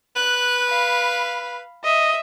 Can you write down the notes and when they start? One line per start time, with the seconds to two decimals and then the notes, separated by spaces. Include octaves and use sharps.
0.16 B4 F#6
0.69 F5 B5
1.85 D#5 E5